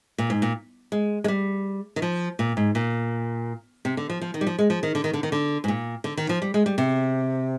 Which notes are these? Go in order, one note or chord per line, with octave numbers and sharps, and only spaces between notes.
A#2
G#2
A#2
G#3
G#3
G3
D#3
F3
A#2
G#2
A#2
C3
D3
F3
F3
D#3
G3
F3
G#3
F3
D#3
D3
D#3
D3
D#3
D3
G#2
A#2
D3
D#3
F3
G3
G#3
G3
C3